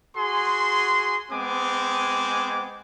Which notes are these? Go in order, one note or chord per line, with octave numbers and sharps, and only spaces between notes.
F#4 G#4 C6
G#3 B3 C4 G#5 D6